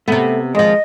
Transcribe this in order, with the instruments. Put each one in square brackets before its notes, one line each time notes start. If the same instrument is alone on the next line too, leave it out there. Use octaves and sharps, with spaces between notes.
[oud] C3 B3 [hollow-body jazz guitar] A3
[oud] D#2 F3 [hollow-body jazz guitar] G#3 [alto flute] D#5